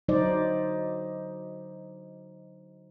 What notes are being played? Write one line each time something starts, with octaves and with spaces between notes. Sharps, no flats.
D3 F#3 D#4 C5 D5 D#5